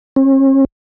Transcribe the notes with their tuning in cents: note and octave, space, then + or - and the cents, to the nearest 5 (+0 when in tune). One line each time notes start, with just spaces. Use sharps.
C#4 -45